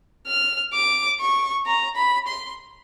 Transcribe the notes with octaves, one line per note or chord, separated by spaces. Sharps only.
F6
D6
C#6
A#5
B5
C6